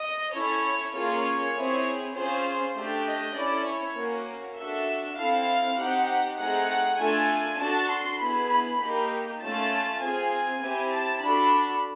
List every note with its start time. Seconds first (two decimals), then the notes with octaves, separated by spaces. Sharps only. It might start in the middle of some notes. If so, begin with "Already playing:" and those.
Already playing: D#5
0.34 C#4 E4 A4 C#5
0.94 A#3 C#4 F4 G#4 C#5
1.55 C4 E4 G#4
2.15 C#4 F4 G#4 C5
2.76 A3 D4 G4
3.05 D#5
3.35 C#4 E4 A4 D5
3.66 C#5
3.96 A#3 C#4 F#4
4.57 D4 F#4 A4 E5
5.17 C4 E4 A4 F5
5.78 C4 D#4 G4 F#5
6.38 A3 C4 D#4 G#4 F#5
6.99 A3 D4 F4 A4 G#5
7.59 D4 F#4 A4 A5
7.89 C6
8.20 B3 E4 G#4 B5
8.50 B5
8.80 A#3 D#4 G4
9.41 A3 C#4 F4 A5
10.01 C4 F4 G#4 G#5
10.61 C4 E4 G4 G#5
10.92 A5
11.21 D4 F#4 A4 B5